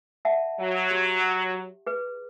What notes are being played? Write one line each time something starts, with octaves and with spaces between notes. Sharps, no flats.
E5 F#5 A5
F#3
G4
G#4 B4